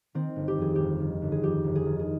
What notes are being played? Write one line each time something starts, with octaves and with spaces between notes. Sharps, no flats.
D#3 C4
G1
G4
F2 G#4
G1 G4
D#3
G1
G#4
F2 G4
G1
G#4
D#3
G#4